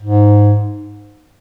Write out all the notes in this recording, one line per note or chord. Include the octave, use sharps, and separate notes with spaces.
G#2